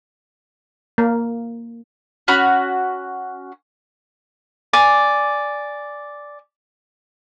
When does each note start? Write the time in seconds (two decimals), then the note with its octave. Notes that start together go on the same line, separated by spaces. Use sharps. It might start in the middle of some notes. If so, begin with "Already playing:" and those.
0.98 A#3
2.28 C#4 F#4 B5
4.73 D5 G#5 D6